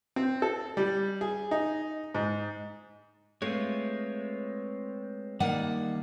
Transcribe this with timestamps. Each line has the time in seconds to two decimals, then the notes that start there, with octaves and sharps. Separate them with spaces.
0.16 C4
0.42 A4
0.77 G3
1.21 G#4
1.51 D#4
2.14 G#2
3.42 G#3 A3 C4 F4 B4 C#5
5.40 D#3 G3 A#3 D5 F#5